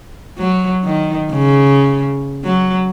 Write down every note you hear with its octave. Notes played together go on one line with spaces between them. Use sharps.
F#3
D#3
C#3
F#3